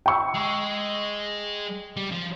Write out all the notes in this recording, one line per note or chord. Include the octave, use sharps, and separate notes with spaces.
G5 C#6 E6
G#3
G3
F3